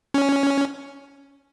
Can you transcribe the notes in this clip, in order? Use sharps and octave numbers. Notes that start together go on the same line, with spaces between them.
C#4